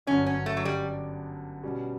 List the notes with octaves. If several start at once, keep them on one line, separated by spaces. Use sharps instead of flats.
G1 F#2 D3 C#4
C#4
A3
F#3
G3
B2 G3 C#4